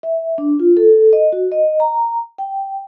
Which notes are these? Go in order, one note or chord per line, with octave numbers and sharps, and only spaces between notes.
E5
D4
F4
A4
D#5
F#4
D#5
A#5
G5